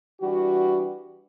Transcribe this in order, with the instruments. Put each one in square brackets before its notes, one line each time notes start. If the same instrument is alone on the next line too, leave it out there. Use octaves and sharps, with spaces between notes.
[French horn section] E3 G3 D4 F#4